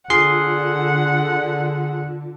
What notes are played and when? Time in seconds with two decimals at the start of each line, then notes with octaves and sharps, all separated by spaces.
0.10 D3 F4 G#4 F#5 C6 C7